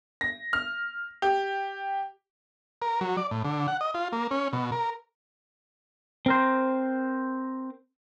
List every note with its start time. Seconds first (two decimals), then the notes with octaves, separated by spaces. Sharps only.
0.21 A#6
0.53 F6
1.22 G4
2.82 A#4
3.01 F#3
3.17 D5
3.31 A2
3.45 D3
3.68 F#5
3.81 D#5
3.94 F4
4.12 A#3
4.31 C#4
4.53 B2
4.72 A#4
6.26 C4 A#4 C5